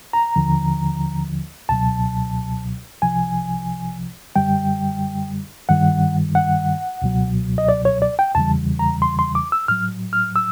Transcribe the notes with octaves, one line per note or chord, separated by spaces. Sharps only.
A#5
D#2 D3 F3
C#2 B2 F#3 A5
C2 C3 F3 G#5
F#2 D3 G3 G5
G2 D#3 G3 F#5
F#5
C#2 B2 F#3
D#5
D5
C#5
D5
G5
E2 C#3 E3 G3 A5
A#5
C6
C6
D6
E6
A2 F#3 F6
F6
E6